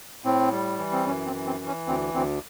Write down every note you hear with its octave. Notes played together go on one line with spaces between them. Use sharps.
A2 C4
G3
E3
C4
F#2 C#4
C4
E3
C4
E3
C#4
D2 C4
D2 C4